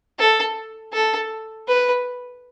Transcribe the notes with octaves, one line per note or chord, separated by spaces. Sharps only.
A4
A4
B4